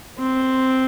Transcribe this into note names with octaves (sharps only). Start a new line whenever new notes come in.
C4